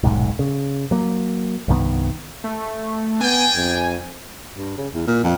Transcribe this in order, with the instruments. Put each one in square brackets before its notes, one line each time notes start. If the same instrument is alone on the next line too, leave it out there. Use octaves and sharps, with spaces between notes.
[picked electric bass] D#1 B1 G#2
C#3
F#3 A#3
C2 G2 D#3 B3
[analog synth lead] A3
[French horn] B3 [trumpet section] D4 G5 [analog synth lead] G#5
[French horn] F2
[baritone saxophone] G2
C#3
E2
A#2
F2